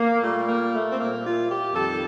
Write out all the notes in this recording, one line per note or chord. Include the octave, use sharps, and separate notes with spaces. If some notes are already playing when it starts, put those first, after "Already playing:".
Already playing: A#3
A#2 G3 A3
A#3
A3
C4
A#2 G3 A#3
F4
G4
F2 D#3 G3 A4